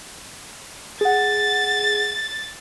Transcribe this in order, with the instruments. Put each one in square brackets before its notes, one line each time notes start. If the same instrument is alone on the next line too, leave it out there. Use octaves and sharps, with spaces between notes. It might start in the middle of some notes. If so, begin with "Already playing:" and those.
[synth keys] G#4 F#5 [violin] A6